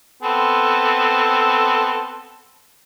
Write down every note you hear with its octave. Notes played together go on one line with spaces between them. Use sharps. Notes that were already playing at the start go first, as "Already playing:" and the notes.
B3 C4 A4